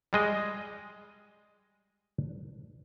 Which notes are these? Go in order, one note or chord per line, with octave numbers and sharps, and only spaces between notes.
G3 G#3 D#5